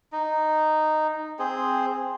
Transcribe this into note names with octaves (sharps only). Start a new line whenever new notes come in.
D#4
C4 G#4